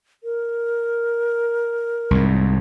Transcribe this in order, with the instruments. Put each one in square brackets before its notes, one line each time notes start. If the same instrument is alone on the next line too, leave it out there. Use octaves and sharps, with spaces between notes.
[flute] A#4
[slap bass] C2 G#2